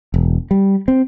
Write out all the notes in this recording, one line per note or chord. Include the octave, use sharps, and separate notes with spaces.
E1
G3
C4